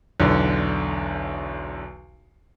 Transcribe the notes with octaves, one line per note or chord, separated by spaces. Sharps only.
B1 E2 D3